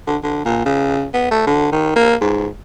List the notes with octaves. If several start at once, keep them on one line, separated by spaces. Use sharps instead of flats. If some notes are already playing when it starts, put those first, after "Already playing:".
D3
D3
A#2
C#3
B3
A3
D3
D#3
A#3
G#2